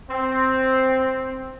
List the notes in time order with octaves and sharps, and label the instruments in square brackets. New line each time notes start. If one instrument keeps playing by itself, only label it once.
[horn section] C4